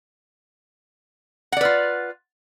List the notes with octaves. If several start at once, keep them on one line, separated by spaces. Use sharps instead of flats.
F4 B4 D5 F#5